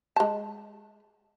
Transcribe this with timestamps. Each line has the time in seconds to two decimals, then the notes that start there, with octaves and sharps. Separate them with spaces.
0.16 G#3 A5